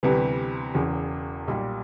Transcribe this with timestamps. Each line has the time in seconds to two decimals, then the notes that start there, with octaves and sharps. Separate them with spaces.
0.03 D2 C3 E3 G3 B3
0.75 E1 E2 C#3
1.48 B1 A#2 G3